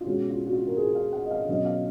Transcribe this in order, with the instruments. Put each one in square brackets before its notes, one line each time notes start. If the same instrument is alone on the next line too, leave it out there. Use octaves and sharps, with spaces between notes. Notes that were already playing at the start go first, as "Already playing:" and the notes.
[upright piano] F4
B2 G#3 C#4 F#4
F4
F#4
F4
A#4
G#4
F5
F#5
D#5
F5
B2 F#3 C#4 D#5
F5